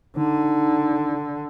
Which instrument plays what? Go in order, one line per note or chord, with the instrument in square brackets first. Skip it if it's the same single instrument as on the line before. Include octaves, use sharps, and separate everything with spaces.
[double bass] D3 [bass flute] D#4